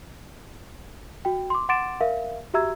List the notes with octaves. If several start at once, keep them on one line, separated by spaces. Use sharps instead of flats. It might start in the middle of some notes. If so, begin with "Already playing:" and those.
F#4 G5
C6 D6
F#5 C6 D6 A6 D7 E7
A#4 E5 F5
F#4 G4 E5 A#5 E6 G#6